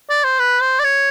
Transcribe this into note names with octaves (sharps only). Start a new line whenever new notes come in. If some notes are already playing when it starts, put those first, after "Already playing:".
D5
C5
B4
C5
D5
C#5